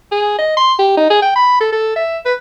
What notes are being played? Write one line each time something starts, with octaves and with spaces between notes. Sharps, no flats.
G#4
D#5
C6
G4
D#4
G#4
G5
B5
A4
A4
E5
B4